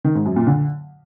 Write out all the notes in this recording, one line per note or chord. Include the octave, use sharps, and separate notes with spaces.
D#3
G#2
F#2
A#2
D3